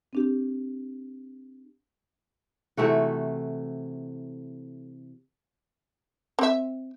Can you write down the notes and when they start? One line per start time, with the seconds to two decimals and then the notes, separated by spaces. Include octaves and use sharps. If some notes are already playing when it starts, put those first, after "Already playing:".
0.13 C4 D4 G4
2.77 C3 E3 A3 F#4
6.39 C4 E5